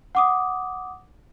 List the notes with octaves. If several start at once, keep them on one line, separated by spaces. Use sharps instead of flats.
F#5 D6 D#6